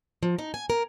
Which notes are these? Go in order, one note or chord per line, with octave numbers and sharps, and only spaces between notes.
F3
D#4
G#5
A#4